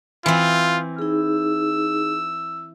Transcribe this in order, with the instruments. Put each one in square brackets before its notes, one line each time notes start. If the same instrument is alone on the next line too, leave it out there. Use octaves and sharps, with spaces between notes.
[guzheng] E3 C4 [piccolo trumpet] F4
[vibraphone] D#4 G#4 [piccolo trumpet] E6